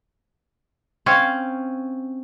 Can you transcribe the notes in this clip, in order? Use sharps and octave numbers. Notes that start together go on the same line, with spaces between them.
C4 C#4 C#5 F5